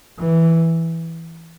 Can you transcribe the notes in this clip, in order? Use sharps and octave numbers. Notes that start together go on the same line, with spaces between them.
E3